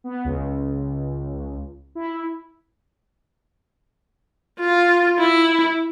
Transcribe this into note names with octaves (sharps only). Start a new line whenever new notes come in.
B3
C#2
E4
F4
E4